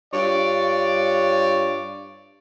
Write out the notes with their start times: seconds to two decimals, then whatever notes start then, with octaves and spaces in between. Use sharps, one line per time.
0.13 G2 F4 C#5 D5